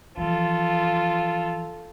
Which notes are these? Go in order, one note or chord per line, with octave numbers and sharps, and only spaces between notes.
E3 F3 F4 A4